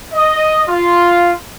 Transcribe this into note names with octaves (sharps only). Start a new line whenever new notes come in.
D#5
F4